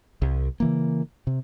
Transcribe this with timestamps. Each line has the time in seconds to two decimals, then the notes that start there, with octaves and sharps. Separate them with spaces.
0.22 C2
0.60 C#3 E3 A#3
1.27 C3